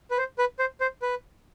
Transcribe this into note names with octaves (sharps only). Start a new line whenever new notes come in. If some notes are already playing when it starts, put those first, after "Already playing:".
B4
C5
B4
C5
C5
B4